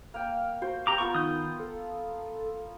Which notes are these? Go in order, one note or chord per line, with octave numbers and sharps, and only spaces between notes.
A#3 G5 F6
F#4 C5
G4 A#5 D6
B3 F4 A#4 C#6 F6
D#3 D#6 G6
A4